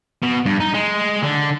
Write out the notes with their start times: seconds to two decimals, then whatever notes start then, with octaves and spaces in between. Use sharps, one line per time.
0.23 B2
0.46 G2
0.60 D#4
0.74 G#3
1.22 D3